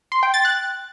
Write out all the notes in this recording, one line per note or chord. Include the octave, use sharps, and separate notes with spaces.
C6
G5
A6
F#6